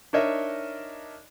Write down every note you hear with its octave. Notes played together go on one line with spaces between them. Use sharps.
D4 D#4 A#4 C#5 D#5 E5